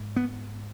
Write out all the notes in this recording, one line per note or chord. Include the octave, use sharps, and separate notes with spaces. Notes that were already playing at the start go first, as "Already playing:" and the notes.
Already playing: G#2
B3